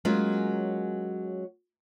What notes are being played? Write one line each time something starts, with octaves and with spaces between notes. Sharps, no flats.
F#3 G#3 A#3 C#4 F4